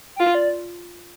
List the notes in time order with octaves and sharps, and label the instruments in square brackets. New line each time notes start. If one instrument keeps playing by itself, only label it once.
[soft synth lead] G5
[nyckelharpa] F4 [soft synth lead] F5
[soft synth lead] D5